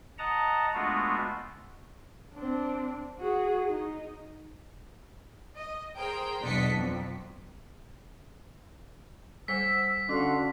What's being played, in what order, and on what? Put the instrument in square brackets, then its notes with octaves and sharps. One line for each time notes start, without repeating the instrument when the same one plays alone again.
[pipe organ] D#5 F#5 A5 A#5
G#3 A3 B3 D4 F4 F#4
[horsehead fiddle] C4 D4
F#4 G#4
D#4
[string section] D#5
G#4 A#4 C5 G5
B1 E2 D4 D#5 B6 C#7
F2
[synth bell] G3 C5 F#5 [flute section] E6 [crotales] B6
[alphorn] D3 [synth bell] C#4 E6 [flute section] F#4 F5 C6